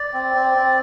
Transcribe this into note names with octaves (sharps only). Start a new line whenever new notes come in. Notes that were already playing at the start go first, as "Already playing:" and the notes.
Already playing: D5
C4
C4
C4